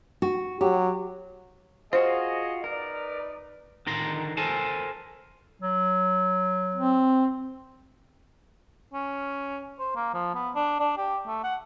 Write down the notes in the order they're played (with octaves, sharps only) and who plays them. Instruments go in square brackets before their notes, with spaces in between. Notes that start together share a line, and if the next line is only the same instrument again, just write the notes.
[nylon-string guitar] F#4
[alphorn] F#3 [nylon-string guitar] G4
[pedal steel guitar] F4 F#4 [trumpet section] G#4 D#5 [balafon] C5
[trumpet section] D#4 B4 D5 [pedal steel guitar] A#4
[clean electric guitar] D3 D#3 A#5 C6
A4 A#4 C5 G#5 A5
[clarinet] F#3
[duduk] C4
[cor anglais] C#4
C5
A#3
F3
B3
D4
D4
G4
A3
F#5